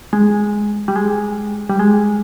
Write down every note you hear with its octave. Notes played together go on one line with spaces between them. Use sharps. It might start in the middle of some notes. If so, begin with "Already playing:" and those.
G#3
G3
G#3
G3
G#3